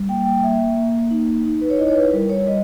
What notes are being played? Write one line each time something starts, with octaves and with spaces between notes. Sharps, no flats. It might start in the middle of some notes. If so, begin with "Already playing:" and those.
Already playing: G3
A#3 G5
G5
A#3 E5
A#3
D#4
D#4
B4
C#5
E4 D#5
C#5
B4
G3 A#4
C#5
G3 D#5